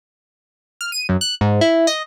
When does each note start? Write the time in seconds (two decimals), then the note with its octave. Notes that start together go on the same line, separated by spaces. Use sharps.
0.81 F6
0.92 D#7
1.09 F#2
1.21 F#6
1.41 G#2
1.61 E4
1.87 D#5